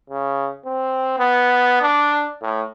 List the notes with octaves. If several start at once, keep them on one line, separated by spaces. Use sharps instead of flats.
C#3
C4
B3
D4
A2